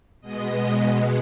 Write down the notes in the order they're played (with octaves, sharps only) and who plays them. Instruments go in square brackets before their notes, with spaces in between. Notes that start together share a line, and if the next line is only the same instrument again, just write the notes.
[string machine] B2 G#3 B3 D#5